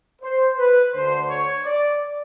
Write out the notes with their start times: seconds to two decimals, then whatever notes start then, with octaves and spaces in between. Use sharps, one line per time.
0.22 C5
0.58 B4
0.93 D2 D3 C5
1.28 C#5
1.64 D5